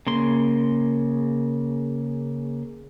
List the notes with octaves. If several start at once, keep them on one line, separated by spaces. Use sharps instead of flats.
C#3 A#3 C6